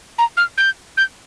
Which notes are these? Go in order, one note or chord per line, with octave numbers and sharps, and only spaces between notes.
A#5
F6
G6
G6